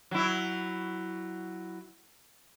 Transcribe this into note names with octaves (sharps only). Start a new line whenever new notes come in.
F#3 E4